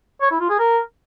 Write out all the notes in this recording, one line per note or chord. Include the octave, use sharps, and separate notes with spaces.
C#5
E4
F4
G#4
A#4